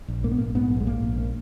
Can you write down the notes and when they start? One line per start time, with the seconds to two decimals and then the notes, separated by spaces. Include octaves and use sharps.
0.08 A#1
0.24 G#2 A#3
0.31 B3
0.38 A#1 A#3
0.55 G#2 B3
0.70 A#1
0.80 G#3
0.86 G#2 A#3
1.03 A#1
1.18 A#3